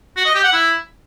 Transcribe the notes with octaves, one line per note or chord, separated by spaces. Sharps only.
F#4
D#5
G4
F#5
E4